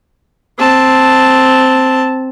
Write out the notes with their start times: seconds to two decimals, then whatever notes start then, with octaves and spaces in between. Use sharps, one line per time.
0.58 C4 A5